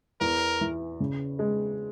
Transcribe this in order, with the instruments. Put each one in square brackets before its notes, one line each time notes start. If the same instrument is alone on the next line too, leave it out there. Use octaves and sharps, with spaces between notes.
[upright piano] E2 [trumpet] A#4
[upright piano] E3
C#3
G#3